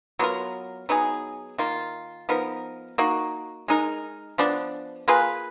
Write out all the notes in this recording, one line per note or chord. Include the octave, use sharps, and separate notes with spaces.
F#3 B3 F4 A#4
F#3 B3 D#4 G#4
D#3 A#3 F4
F3 B3 D#4 A#4
A#3 D#4 F#4
G#3 D#4 A#4
F3 B3 D4
A#3 F4 G#4 B4